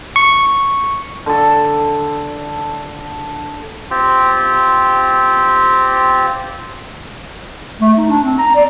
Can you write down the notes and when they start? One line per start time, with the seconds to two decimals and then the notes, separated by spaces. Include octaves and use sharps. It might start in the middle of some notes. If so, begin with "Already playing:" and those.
0.16 C#6
1.26 D3 A4
3.91 C4 F4 G4
7.81 A3
7.98 D#4
8.09 D4
8.23 C4
8.39 A#5
8.55 D5